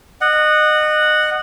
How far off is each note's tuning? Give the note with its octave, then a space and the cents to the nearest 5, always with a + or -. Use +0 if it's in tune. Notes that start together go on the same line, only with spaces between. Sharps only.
D#5 -30 F#5 +0